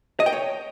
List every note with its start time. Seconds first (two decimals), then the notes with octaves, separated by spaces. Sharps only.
0.20 D#5
0.26 G5
0.32 C#5